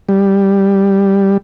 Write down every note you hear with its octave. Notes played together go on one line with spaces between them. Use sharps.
G3